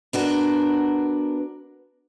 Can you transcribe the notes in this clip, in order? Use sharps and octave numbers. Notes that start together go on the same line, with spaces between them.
B3 D4 F#4 A#4